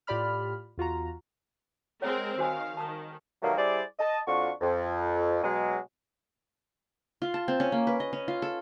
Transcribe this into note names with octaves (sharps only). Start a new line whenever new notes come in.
A2 F4 G4 D5 B5 F6
E2 F4 F#4 A#5
G#3 C4 A#4 C#5 F#5 G5
D#3 F#4 C5 F5 G#5
D#3 A5 D#6
B2 D#3 F#3 G3 A3 A#3
G3 E4 G#4 C5 D5
D#5 A5
F2 D4 F4 F#4 C#6
F2
B2 F#3 G#3
F4
A5
C4
C#4
A#3
B4
D#5
C#4
F4
A4